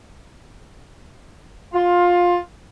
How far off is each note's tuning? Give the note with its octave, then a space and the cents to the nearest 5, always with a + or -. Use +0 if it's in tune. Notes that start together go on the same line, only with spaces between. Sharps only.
F4 +15